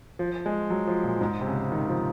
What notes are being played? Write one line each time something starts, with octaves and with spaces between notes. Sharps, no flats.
F3
G#3
F#3
F3
A#2
G#2
C3
C#3
D#3
F3